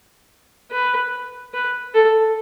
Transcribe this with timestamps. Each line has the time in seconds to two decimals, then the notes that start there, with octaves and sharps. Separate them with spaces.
0.71 B4
1.54 B4
1.94 A4